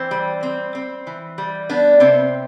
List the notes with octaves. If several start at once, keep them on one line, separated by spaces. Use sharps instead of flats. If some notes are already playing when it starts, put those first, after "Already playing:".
Already playing: E3 C4
G3
C4
C4
E3
G3
B3 D4
C3 C4